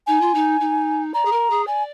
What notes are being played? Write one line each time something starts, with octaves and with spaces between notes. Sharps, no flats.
D#4 G#5
F4
D#4
D#4
D5 A#5
G#4
A#4
G#4
D5 G#5